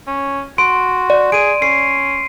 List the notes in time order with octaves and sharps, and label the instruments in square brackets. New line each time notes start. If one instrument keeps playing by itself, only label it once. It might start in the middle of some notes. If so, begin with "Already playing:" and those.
[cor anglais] C#4
[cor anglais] F#4 [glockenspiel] C6 [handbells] D7
[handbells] D5
[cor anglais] G#4 [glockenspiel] D7 D#7
[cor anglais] C#4 [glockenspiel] C7